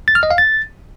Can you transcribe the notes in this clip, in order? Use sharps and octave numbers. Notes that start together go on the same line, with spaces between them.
A6
F6
D#5
F5
A6